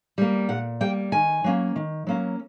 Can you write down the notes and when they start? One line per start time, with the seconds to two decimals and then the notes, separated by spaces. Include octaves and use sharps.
0.18 G3 A#3
0.49 A#2 F#5
0.81 G3 A#3 G5
1.12 D#3 G#5
1.44 F#3 A#3 C#4
1.76 D#3
2.07 F#3 A#3 C#4